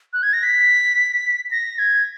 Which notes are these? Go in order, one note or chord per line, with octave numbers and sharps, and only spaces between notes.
F#6
G#6
A#6
B6
A#6
G#6